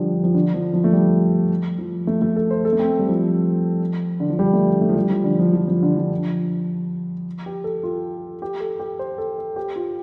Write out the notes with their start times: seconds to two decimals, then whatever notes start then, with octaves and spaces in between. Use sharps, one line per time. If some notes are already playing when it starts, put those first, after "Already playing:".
Already playing: D3 F3 G3
0.24 F3
0.34 D3
0.54 F3
0.74 F3
0.84 A3
0.93 G3
1.79 F3
2.07 A3
2.22 A3
2.36 A4
2.51 C5
2.65 A4
2.73 A3
2.79 C4
2.99 G3
3.09 F3
4.20 D3
4.30 F3
4.39 G3
4.53 A3
4.81 A3
4.89 F3
4.96 G3
5.10 F3
5.24 D3
5.39 F3
5.53 F3
5.68 F3
5.83 D3
5.97 F3
7.46 G4
7.64 A4
7.83 F4
8.42 G4
8.60 A4
8.79 G4
8.99 C5
9.18 A4
9.38 A4
9.56 G4
9.76 F4